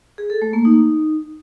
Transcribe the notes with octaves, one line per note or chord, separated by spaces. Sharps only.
G#4
A4
A3
A#3
D#4